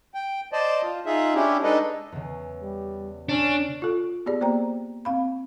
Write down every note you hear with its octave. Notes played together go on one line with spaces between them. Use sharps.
G5
C5 D5 D#5 A5
F4
D#4 F4 G#4 E5
C#4 D4 E4 G4
G#3 D4 D#4 A4 B4 D#5
E2 C#3
G3
C#4 D4
F4 A4
B3 G4 G#4 D5
A#3 C5 D5 G5 A#5
C4 F5 B5